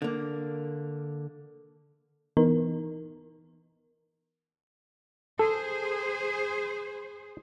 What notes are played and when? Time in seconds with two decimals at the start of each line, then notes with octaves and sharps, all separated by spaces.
0.02 D3 A#3
2.37 E3 B3 D#4 A#4
5.39 G#4 A4 C5